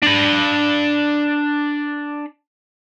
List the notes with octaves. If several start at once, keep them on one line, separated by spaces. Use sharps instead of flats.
D4 B5